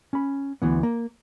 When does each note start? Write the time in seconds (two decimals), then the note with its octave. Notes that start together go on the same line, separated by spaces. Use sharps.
0.13 C#4 B5
0.62 D2 E3 B3
0.83 A#3